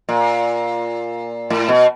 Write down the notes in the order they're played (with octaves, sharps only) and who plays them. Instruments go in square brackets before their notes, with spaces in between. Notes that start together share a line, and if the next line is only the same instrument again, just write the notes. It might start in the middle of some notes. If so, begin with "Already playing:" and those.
[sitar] A#2
A2
B2